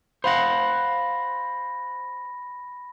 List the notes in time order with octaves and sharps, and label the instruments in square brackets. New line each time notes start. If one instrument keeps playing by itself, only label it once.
[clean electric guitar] C5 F5 F#5 [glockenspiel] B5 A#6